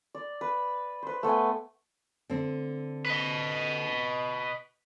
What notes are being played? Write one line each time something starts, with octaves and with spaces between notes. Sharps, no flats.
D5
B4
B4 C5
A3 B3 G5 G#5
D3 C4
B4 D#5